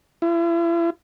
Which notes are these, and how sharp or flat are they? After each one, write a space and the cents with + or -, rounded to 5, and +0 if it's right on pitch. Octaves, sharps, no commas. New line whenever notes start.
E4 +40